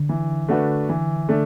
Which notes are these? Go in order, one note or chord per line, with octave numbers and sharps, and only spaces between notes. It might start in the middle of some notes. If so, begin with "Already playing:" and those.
Already playing: D3
E3
A3 D4 F#4 B4
E3
A3 D4